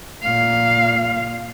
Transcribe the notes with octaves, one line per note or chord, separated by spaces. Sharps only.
A#2 F5